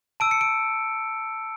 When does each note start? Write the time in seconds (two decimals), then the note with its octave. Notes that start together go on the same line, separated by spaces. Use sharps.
0.20 A5 E6 D7
0.31 C#7
0.41 D7